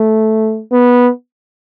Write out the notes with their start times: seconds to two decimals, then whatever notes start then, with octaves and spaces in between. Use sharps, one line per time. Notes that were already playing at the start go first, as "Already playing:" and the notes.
Already playing: A3
0.71 B3